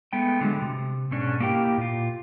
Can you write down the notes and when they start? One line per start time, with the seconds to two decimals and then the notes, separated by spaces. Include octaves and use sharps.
0.13 G#3 A3 B3 G5
0.41 D3 F#3 G#3
0.62 C3
1.11 G#2 B2 C#4 D4
1.40 A#3 E4 G4 G5
1.78 A#2 F4